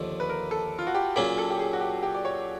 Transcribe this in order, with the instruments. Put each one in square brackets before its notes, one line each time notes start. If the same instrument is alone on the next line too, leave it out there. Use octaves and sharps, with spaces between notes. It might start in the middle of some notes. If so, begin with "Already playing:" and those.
Already playing: [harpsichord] D#2 D3 F3 A3
[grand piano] B4
A#4
A4
F4
F#4
G4
[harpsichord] A#2 F#3 A#3 C#4 [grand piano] G#4
[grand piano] A4
G4
G#4
F#4
G4
G4
D5
C#5